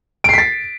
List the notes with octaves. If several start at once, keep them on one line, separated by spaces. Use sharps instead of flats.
A6 B6 C7 D7